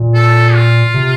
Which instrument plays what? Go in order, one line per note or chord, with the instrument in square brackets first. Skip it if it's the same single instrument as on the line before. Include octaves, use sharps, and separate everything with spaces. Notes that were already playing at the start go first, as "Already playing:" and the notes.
Already playing: [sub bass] A#2
[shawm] A4
F4
[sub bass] C3